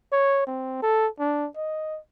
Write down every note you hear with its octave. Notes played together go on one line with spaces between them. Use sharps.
C#5
C4
A4
D4
D#5